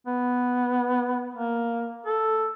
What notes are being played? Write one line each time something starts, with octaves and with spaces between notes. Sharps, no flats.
B3
A#3
A4